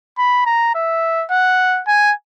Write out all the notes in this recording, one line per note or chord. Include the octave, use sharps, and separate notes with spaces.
B5
A#5
E5
F#5
G#5